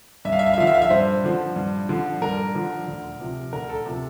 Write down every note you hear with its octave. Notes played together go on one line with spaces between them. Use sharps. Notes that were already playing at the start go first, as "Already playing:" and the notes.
G2 E5
F5
E5
F5
E5
D3 F3 F5
E5
F5
E5
G2 C5
D3 F3
G2
D3 F3
G2 A#4
D3 F3
D2
C3 F3
D2 A#4
A4
C3 F3